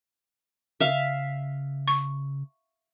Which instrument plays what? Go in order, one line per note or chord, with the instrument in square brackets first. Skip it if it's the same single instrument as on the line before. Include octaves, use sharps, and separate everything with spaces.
[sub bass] C#3 [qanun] E5 F5
[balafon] C#6